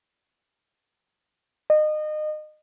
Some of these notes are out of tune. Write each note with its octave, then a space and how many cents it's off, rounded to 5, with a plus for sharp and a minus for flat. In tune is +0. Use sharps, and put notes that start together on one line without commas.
D#5 -30